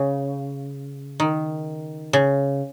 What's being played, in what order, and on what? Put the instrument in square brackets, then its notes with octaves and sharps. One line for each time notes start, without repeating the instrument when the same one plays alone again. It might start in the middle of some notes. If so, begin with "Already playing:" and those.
Already playing: [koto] C#3
D#3
C#3